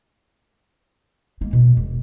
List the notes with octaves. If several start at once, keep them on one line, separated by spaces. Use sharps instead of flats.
G#3 A#3
B2
E1